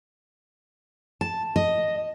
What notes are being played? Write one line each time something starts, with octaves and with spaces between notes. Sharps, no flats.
A5
D#5